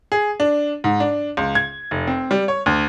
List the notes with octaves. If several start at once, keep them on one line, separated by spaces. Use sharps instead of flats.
G#4
D4
G#2
D4
C#2
G#6
F1
C4
G3
C#5
D2